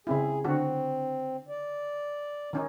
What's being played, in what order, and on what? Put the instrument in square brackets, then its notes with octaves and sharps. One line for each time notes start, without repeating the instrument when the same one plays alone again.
[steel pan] C#3 C4 E4 [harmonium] G#4
[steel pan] D3 F#4 [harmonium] C4
[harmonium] D5
[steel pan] D#3 C#4 D#4